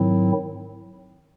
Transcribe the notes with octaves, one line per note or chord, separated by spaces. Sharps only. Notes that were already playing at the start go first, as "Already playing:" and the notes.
Already playing: G#2 D#3 F#3 C4 E4